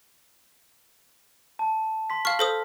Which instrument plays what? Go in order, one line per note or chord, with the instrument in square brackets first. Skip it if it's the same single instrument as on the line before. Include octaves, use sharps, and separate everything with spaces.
[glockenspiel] A5
C6 B6
[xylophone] F5 C#6 [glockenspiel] F6
[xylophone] A4 C5 D#6 [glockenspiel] A#6